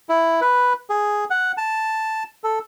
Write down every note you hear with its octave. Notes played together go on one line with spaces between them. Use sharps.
E4
B4
G#4
F#5
A5
A4